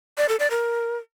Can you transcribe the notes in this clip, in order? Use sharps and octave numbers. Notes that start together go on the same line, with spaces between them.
D5
A4
D5
A#4